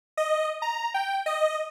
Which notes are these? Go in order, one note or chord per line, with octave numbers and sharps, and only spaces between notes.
D#5
A#5
G5
D#5